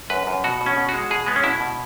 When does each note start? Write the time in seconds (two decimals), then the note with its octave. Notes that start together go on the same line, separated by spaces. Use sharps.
0.10 F#2 B4
0.27 F#2
0.44 B2 F#4
0.61 B2
0.66 C#4
0.76 B2
0.89 G#3 F#4
1.10 B2 G#4
1.26 G#3 B3
1.36 C#4
1.43 B2 E4
1.60 B2